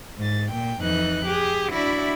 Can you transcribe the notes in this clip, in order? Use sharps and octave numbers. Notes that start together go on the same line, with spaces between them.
G#2 A6
A#2 G5
F2 E3 D#4 F#6
G4 G#4
D4 E4 F#4 D5 E5 B5